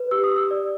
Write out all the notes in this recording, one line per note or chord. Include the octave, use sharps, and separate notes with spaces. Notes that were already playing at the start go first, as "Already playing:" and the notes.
Already playing: B4
G4 E6
D#6
G4
E6
D5